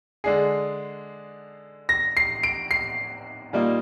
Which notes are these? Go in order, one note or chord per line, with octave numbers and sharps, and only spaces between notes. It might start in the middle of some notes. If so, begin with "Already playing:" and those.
D3 G#3 D4 G#4 C7
A#6
C7
D7
C7
A#2 G3 A#3 D#4